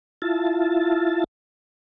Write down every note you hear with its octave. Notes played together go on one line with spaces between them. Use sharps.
E4 F4 A5